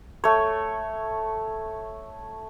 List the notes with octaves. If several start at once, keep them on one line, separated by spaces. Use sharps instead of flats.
A3 C#5